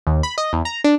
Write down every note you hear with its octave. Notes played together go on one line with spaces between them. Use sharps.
D#2
B5
D#5
E2
A#5
D4